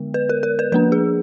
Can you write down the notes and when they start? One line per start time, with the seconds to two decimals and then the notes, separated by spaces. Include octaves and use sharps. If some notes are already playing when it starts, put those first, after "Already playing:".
Already playing: D3 G#3 B3
0.14 B4
0.29 A#4
0.43 A#4
0.59 B4
0.72 F3 A#3 D4 B4
0.92 G#4